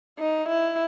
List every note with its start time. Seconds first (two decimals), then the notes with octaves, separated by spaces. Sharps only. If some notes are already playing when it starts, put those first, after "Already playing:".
0.19 D#4
0.49 E4